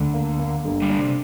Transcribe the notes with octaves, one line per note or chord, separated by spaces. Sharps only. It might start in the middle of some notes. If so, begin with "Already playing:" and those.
Already playing: D2 D3
A#3
A#3
G1
D3 G3
D4
C3